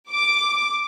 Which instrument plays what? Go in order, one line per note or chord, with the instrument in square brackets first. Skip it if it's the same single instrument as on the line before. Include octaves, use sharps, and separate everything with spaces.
[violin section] D6